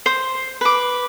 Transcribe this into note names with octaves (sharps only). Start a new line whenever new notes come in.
C5
B4 D6